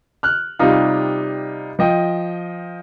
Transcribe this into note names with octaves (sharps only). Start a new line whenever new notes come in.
F6 F#6
C3 G3 D#4 F4
F3 D#5 G5